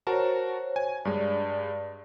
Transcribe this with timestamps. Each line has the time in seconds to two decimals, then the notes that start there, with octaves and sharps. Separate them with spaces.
0.07 F#4 A#4 C5 C#5 A5
0.76 G#5
1.05 G2 G#3 D5